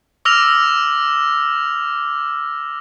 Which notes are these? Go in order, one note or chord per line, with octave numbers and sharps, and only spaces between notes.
D6 E6 F6 A#6 F7